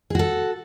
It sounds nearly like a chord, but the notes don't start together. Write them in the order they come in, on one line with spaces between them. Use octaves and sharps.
G#4 F#4 A4